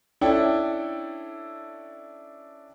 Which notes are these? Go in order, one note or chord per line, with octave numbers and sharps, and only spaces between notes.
C#4 D4 E4 A4 G5